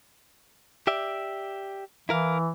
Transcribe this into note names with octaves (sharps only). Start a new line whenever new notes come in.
G4 D5 E5
E3 E4 A#4 F5